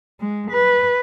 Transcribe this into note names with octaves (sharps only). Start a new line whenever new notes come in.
G#3
B4